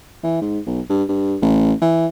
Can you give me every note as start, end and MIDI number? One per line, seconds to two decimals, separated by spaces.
0.23 0.38 52
0.41 0.59 44
0.66 0.81 35
0.89 1.04 43
1.09 1.37 43
1.42 1.73 33
1.82 2.07 52